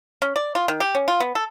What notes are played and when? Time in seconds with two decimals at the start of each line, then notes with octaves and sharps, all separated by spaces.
0.22 C#4
0.36 D5
0.55 F4
0.68 D#3
0.80 G4
0.95 C#4
1.08 F4
1.20 B3
1.35 A4